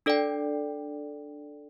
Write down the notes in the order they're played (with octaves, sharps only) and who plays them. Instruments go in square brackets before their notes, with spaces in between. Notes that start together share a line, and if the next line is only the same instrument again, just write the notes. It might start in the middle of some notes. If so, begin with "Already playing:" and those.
[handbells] D4 A4 D5 G5